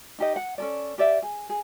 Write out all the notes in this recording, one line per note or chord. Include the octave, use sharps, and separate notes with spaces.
D#4 G4 D#5
F#5
C#4 A4 D5
G4 D5 E5
G#4
G#4